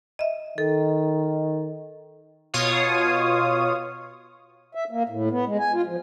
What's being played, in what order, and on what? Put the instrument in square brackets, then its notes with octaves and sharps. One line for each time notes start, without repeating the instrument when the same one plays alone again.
[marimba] D#5 E5
[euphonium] D#3 [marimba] A4
[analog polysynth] B2 F4 C#5 F5 D#6
[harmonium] E5
A#3
A2
B3
G#3
G#5
F4
F3